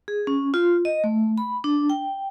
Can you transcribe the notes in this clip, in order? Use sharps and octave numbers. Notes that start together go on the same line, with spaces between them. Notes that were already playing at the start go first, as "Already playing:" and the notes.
G#4
C#4
F4
D#5
A3
B5
D4
G5